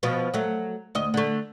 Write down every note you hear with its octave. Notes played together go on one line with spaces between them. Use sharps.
B2 F3
F#3 A3
D2 D#5
D3 A3